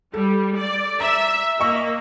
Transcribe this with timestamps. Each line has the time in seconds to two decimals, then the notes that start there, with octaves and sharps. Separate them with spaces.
0.14 G3 A4
0.57 D5
1.00 E5 A#5
1.60 A#3 D#5 C#6 E6